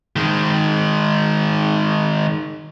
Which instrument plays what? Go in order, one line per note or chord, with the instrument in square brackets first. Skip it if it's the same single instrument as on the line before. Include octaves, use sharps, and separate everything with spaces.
[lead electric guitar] D#3 G#3